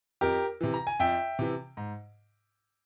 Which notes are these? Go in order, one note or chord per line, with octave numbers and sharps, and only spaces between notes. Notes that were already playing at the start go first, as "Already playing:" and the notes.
F2 G4 A#4
C3 E3
A#5
G#5
F2 E5 G5
C3 E3
G#2